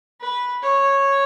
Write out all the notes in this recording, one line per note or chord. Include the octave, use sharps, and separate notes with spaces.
B4
C#5